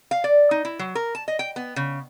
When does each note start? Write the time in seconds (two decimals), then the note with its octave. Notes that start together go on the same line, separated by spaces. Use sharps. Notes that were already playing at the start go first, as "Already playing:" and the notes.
0.11 F5
0.24 D5
0.51 D#4
0.65 E4
0.79 F#3
0.95 A#4
1.15 A5
1.28 D#5
1.39 G5
1.56 B3
1.76 C#3